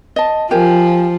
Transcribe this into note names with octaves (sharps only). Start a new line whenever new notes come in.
D#5 A5
F3 G4 A#4 G#5